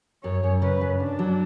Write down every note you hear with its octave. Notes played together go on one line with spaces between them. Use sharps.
F#2 C#5
F#2
C#3 B4
F#2
F#2 D4
F#3